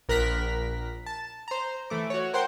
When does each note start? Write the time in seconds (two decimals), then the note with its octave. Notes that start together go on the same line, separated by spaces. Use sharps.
0.09 A#1 A#4 F#6 A#6 B6
1.06 A5
1.48 C5 A#5
1.90 E3 A3 D6
2.10 F#4 C#5
2.33 A#4 C5 F#5 G5 C6